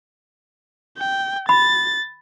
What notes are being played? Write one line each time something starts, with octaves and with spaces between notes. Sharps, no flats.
G5
B5 A6